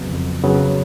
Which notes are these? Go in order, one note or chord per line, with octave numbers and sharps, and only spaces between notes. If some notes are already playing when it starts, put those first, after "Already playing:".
Already playing: F2 C#3 F#3 B3
F2
C#3 F#3 B3